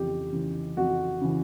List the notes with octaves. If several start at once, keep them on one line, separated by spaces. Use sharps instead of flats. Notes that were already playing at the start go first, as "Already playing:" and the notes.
Already playing: F2 C#3 E3 G4
C#3 E3
F2 F#4
C#3 E3